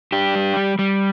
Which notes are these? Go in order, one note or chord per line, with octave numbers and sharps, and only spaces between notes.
D4 G4
G3
G3
G3